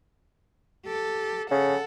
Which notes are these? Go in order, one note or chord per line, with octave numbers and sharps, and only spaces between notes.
G4 A4
C#3 A4 F#5